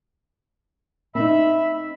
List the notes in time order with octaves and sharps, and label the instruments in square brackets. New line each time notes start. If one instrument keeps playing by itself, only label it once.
[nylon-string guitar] C4 D#4 [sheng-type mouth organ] E5 B5 E6